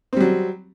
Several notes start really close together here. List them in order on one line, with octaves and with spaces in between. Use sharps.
C4 G3 F#3